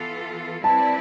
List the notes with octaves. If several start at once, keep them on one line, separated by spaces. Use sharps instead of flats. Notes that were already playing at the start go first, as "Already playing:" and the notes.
Already playing: E3 B3 F4 A4
G3 C4 E4 B4 D5 A5